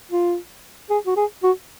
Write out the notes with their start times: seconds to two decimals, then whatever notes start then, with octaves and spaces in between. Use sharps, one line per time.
0.11 F4
0.90 G#4
1.07 F#4
1.17 G#4
1.43 F#4